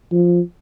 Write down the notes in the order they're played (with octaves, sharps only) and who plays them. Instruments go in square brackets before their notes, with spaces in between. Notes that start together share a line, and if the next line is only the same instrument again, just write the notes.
[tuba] F3